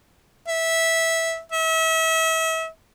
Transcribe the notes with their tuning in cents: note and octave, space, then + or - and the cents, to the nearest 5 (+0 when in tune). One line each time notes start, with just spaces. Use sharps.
E5 -10
E5 -35